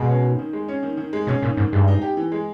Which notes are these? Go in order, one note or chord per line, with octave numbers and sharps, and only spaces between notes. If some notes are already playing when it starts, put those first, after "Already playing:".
Already playing: B2 G#3
C#4
D#3
D#3
G#3
C#4
D#3
D#3
G#3
B2 C#4
A#2 D#3
G#2 D#3
G2 G#3
D#4
G4
E3
G#3